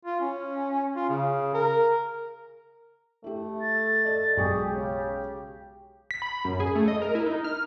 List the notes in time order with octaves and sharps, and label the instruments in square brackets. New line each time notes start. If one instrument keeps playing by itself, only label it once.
[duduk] F4
C#4
F4
C#3
A#4
[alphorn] A3 [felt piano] E4 G4
[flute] A6
[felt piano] A4 D5 D#5
[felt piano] B1 G#3 C#6 [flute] G4 [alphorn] G#4
[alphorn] C#3
[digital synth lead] B6
B5
F#2
G#4
A3
D#5
A#4
E4
D#4
F6